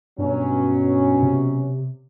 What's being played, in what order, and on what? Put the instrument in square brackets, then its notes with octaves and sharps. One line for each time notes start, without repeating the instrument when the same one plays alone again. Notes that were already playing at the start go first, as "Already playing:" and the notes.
[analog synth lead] G2 [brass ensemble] B2 F#3 C#4
[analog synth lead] C3